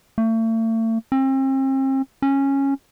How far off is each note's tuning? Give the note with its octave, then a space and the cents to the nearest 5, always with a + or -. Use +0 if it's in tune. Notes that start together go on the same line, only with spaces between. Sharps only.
A3 +40
C4 +40
C#4 -10